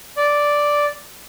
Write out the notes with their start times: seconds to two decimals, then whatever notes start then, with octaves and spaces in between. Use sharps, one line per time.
0.17 D5